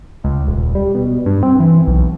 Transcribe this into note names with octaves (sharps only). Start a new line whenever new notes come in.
C#2
D#1
G3
B2
G2
C4
E3
B1